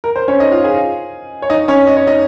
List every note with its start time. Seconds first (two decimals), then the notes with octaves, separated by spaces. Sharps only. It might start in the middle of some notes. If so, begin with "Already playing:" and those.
0.04 A#4
0.16 C5
0.28 C#4 C#5
0.40 D#4 D#5
0.52 F4 F5
0.64 G#4 G#5
1.42 C#5
1.50 D#4 D#5
1.68 C#4 C#5
1.87 D#5
1.97 C#5
2.07 D#4 D#5